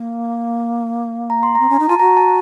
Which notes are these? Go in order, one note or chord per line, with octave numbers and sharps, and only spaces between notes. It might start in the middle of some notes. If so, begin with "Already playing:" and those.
Already playing: A#3
A#5
C6
C4 A#5
C#4
D#4
F4 A5
F#4 A#5
A5